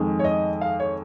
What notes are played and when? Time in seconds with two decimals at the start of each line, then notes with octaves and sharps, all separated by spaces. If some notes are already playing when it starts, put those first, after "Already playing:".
Already playing: F2 D#3 G#3
0.19 C#5
0.24 D#5
0.61 F5
0.80 C#5